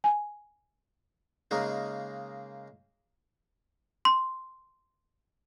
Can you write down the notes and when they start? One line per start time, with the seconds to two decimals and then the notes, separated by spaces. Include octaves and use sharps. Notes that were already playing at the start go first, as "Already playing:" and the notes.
0.04 G#5
1.51 C#3 G#3 A#3 D#4
4.05 C6